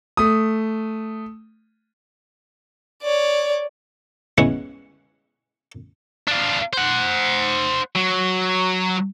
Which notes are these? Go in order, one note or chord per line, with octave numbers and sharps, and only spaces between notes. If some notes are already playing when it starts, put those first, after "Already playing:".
A3 D#6
C#5 D5
G#3 B3 C#4 E4 C#5 F#5
D4 F4
C5 F#5
F#3